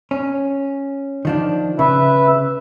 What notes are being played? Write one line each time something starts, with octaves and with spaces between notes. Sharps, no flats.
C#4
D#3 F3 D4
C#3 B4 E5